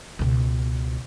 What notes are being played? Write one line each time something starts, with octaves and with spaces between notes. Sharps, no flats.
C#2 B2